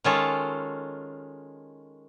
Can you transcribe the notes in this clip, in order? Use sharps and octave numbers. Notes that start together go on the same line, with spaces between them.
D#3 G#3 C#4 F4 A4